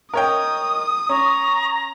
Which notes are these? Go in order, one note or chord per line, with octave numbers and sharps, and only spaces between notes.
A#4 C#5 D#5 G5 D#6
C#4 A#5 C#6